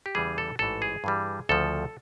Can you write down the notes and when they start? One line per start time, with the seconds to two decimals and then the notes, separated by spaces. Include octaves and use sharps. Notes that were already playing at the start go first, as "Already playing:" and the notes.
0.06 G4
0.15 E2 C#3 E3 G3 G#4
0.38 A4
0.59 A1 G#2 E3 A3 A4
0.82 G#4
1.04 G2 E3 G3
1.49 D2 C#3 F3 A4